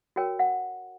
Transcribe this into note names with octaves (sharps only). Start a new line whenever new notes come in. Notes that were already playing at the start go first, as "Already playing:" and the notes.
F#4 A#4 C#5 G5
F#5